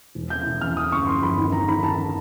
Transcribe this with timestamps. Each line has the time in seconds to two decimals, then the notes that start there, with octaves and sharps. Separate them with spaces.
0.15 E1
0.30 E3 G6
0.46 E1
0.61 E2 F6
0.77 C#3 D#6
0.92 G1 C#6
1.07 F3 C6
1.23 G1 B5
1.38 D#3
1.52 D#3 A#5
1.68 D#3 B5
1.83 D#3 A5